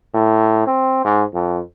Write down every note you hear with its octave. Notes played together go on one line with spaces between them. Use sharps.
A2
C4
G#2
F2